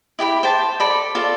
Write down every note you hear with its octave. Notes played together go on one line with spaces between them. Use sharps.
E4 G4 G5 B5
C5 G5 A5
A4 D5 B5
F4 A4 D5